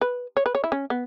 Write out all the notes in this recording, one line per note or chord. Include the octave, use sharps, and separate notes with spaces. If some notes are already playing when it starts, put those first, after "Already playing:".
B4
C#5
B4
C#5
E4
C#4
B3